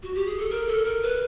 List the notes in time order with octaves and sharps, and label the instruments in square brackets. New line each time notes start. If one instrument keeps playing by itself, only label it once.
[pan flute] F#4
G4
G#4
A4
A#4
A4
A#4
B4